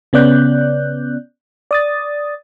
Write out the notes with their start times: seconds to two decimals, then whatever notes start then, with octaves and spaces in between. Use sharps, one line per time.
0.13 C#3 B3 C#4 D5 F#6 G6
1.71 D5 D#6 A6